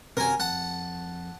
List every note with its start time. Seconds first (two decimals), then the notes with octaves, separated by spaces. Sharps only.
0.17 C3 C#4 F#4 A#4 G#5
0.40 F2 F#5 A5